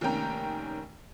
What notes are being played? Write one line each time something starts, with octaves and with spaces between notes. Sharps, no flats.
F1 D#3 A#3 C#4 G5 A#5